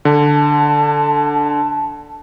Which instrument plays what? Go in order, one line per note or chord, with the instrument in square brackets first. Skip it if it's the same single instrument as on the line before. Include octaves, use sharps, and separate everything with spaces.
[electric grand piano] D3 [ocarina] A5